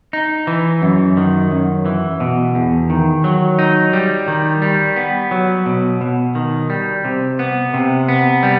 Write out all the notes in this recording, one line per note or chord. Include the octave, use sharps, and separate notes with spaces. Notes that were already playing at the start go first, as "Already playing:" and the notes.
D#4
E3
F#2
D#3
F#2
E3
B2
E2
D#3
F#3
D#4
G3
D#3
G3
B3
F#3
B2
B2
D#3
G3
C3
B3
C3
B3
G3